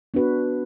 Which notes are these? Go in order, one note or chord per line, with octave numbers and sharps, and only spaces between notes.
B3 D4 F#4 B4